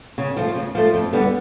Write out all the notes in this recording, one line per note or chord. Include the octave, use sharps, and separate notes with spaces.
C#3
F3 A3
C#3
F3 A3
F2
D3 G3 B3